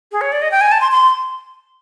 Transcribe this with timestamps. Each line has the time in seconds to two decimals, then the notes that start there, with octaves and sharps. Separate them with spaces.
0.12 G#4
0.21 C#5
0.32 D5
0.42 D#5
0.51 G5
0.61 G#5
0.72 A5
0.81 C6
0.92 C6